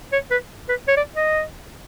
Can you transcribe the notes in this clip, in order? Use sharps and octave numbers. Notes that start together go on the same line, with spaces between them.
C#5
B4
B4
C#5
D5
D#5